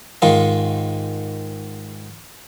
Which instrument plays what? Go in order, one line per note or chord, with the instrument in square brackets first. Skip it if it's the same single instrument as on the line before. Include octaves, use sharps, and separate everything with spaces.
[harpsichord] G#2 D#3 F4